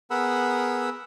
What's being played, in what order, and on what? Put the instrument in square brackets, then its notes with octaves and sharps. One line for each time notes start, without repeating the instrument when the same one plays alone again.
[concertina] B3 G#4 A#4 F#5 B5 E6